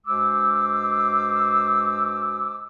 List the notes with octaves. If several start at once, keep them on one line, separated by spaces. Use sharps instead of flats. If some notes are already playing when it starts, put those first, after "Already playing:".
G2 G#3 F#4 C5 D6 E6